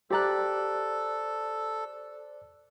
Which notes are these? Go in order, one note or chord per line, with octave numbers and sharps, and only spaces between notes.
G4 A4 C5 D5 A#5 F#6